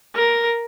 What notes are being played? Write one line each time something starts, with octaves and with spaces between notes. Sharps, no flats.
A#4